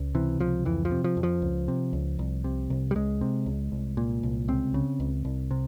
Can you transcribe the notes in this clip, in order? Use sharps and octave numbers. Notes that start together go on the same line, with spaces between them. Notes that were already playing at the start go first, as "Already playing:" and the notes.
Already playing: C#2
C3 E3
C#2 F3
F2 E3
F3
C3
F3
F2
F3
C#2
C3
C#2
C2
C3
C2
G3
C#2 G#3
C3
C#2
C2
A#2
C2
C#2 C4
C#3
C#2
C2
C3